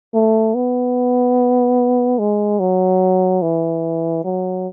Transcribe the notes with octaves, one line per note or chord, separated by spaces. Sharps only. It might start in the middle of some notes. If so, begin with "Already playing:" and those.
A3
B3
G#3
F#3
E3
F#3